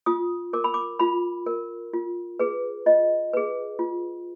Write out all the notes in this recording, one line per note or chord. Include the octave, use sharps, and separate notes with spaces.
F4 D#6
A#4 D6
B5
D6
F4 B5
A#4
F4
G#4 B4
F4 D#5
G#4 B4
F4